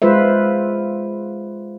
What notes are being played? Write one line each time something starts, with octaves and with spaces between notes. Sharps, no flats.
G#3 F4 B4 C5 E5